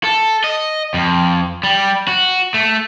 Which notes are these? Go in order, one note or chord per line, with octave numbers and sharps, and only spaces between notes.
A4
D#5
F2
G3
F#4
A3